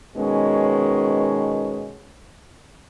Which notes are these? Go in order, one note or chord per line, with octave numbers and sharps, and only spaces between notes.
B2 D#3 G#3 B3 C#4